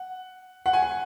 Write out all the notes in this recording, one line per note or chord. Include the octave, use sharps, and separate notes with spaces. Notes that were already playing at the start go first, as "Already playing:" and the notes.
Already playing: F#5
F#5
G#5
F#5